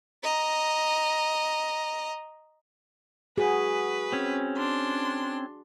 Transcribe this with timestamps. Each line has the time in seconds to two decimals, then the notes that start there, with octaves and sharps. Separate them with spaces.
0.23 D#5 A#5
3.38 F#4 G#4 B4
4.12 C4 C#4
4.57 D4 C6